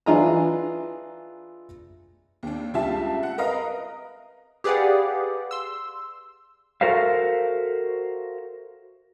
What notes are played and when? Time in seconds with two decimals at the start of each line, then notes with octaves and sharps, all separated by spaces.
0.06 E3 D4 F4 G#4 D#5 A#5
2.43 D#2 D4
2.74 C#2 G3 F4 E5 A5
3.23 F#5
3.38 A#4 B4 D#5 F5 A#5
4.64 G4 G#4 B4 D5 F5 F#5
5.51 C6 E6
6.81 F#4 A4 A#4 C5 E5 F5